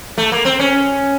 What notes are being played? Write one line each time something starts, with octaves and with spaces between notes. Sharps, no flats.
A3
A#3
C4
C#4